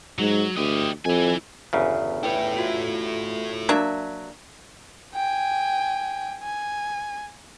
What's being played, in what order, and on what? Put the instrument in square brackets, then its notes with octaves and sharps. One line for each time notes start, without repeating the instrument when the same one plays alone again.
[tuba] G#2 [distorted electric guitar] F#3
[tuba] D2 [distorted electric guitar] G4 D#5
[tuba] F2 [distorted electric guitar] E4 G#5
[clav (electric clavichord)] G1 E2 C#3
[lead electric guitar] A3 E4 [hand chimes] B4 G5
[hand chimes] F4 F#4
[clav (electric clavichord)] F#3 [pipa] A#3 D4 E5
[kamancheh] G5 G#5
G#5